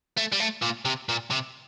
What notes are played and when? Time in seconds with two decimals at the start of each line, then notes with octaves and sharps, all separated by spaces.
0.18 A3
0.33 G3
0.40 A3
0.62 A#2
0.85 C3
1.09 A#2
1.31 C3